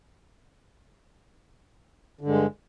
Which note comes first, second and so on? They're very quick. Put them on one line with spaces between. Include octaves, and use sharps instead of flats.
D3 G2 G#3